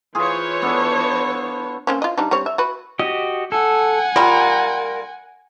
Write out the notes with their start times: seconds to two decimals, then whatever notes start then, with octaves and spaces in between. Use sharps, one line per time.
0.15 E3 F4 G#4 C5 C#5
0.62 B3 D4 A4
1.87 A#3 C4 C#4
2.02 F4 D#5
2.17 G3 D4 D#4
2.31 G3 C4 C#5
2.46 E5
2.58 F#4 B4
2.99 F#4 G4 D#5
3.52 A4 F#5 G#5
4.16 G3 F4 A#4